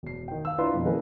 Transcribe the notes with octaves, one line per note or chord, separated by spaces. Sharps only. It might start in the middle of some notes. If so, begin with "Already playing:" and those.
E1 C7
D#3 G5
F5 E6
D4 E4 F4 B4 A#5 C6
F2 B2
E3 G#3 A#3 C#4 A4 B4